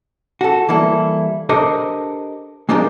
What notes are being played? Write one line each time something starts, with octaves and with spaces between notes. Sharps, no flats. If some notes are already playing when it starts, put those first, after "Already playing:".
F#4 A4
E3 G3 A#3 E4 A4
D4 G4 A4 A#4 C5 D#5
G#3 D4 D#4 F4 G4 A#4